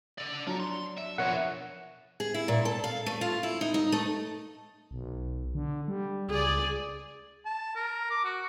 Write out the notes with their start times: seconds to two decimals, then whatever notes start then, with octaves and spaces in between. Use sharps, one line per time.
0.18 A4 D5
0.47 F#3 D4 F4 A#5
0.60 C6
0.97 E5
1.18 B2 F3 A#4 C#5 E5 F#5
2.20 G#4
2.34 E4
2.48 A#2
2.65 A4
2.84 F5
3.06 A3
3.21 F4
3.43 E4
3.61 D#4
3.74 D#4
3.92 A3
4.91 B1
5.55 D3
5.88 G3
6.29 C#2 G#4 D5
7.45 A5
7.76 A#4
8.11 D6
8.25 F#4